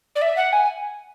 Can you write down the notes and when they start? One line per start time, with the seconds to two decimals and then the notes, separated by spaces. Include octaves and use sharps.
0.16 D5
0.22 E5
0.37 F#5
0.53 G#5